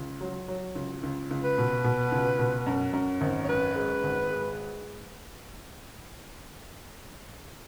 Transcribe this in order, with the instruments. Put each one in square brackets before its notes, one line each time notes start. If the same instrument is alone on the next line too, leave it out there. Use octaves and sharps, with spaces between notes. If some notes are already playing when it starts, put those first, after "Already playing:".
Already playing: [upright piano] C#2
F#3
F#3
C#2
C#2
C#2
[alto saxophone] B4
[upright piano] B2
B2
C#2
B2
F#2
F#2
G#1
[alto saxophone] C#5
[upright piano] F#2 [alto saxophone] B4
[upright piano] G#3
G#1
G#3